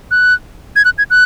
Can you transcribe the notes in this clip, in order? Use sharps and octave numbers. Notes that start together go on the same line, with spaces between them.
F#6
G#6
F#6
G#6
F#6